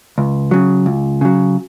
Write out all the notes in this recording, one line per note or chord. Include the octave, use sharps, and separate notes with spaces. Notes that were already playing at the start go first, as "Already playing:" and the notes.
C#2
C#3 F#3
C#2
C#3 F#3